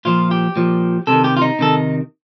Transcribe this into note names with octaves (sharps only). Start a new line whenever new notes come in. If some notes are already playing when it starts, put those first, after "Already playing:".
A#2 F3 F4
G4
A#2 F3
C3 D#3 A4
G4
F4
D#4
C3 D#3 A4